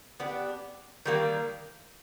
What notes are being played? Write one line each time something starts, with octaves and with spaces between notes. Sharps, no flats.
B3 D4 G4
D#3 G3 A#3